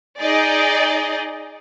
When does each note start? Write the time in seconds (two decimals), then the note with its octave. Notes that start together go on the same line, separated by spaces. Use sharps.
0.22 D#4 G#4 D5 D#5